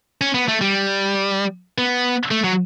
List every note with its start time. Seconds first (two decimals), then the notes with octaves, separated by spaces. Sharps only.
0.21 C#4
0.34 B3
0.48 A3
0.61 G3
1.78 B3
2.31 A3
2.44 F#3